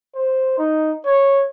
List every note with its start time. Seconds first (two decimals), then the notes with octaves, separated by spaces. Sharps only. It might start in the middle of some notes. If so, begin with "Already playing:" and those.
0.15 C5
0.58 D#4
1.06 C#5